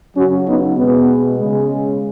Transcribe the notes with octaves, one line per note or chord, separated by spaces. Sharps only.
C#3 F#3 C#4 F#4
B3 D#4
B2 G#3 B3
C#3 G#3